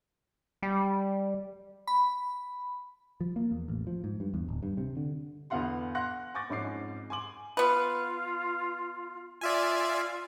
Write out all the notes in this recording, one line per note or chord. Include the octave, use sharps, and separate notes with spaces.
G3
B5
F3
A#3
E2
A1
F3
G#2
G2
E2
D1
G2
C3
D3
E2 D3 B3 F5 F#5 C6
F5 F#5 C6 F#6 A#6
G#5 C#6 D6 G6 A6 A#6
F2 G#2 C#4 D6 C7
G#5 C6 D6 F#7
B3 F4 B4
F4 D5 E5 G#5